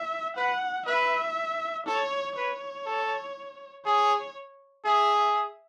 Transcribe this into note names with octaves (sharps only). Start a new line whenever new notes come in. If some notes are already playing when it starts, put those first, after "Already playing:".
Already playing: E5
B4 F#5
B4 E5
A4 C#5
B4 C#5
A4
G#4 C#5
G#4 E5